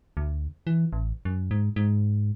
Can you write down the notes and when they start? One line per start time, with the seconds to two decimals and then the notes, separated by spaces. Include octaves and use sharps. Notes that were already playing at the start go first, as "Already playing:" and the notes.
0.17 D2
0.67 E3
0.93 A1
1.25 F#2
1.51 G#2
1.76 G#2